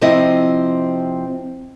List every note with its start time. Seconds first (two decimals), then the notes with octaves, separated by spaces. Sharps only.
0.01 C3 F3 C4 E4 D#5